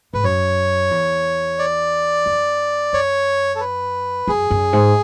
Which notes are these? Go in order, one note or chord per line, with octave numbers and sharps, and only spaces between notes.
G#2 B4
F#2 C#5
E2
D5
F#2
F#2 C#5
A4
B4
F#2 G#4
F#2
G#2